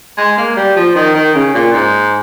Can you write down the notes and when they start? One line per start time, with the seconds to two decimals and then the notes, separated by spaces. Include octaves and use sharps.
0.18 G#3
0.38 A#3
0.56 G3
0.76 F3
0.95 D#3
1.15 D#3
1.35 C#3
1.54 A#2
1.73 G#2